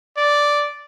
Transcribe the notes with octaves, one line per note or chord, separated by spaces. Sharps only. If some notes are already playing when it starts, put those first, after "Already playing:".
D5